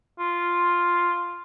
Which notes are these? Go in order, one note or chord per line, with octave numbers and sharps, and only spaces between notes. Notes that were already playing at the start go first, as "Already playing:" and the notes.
F4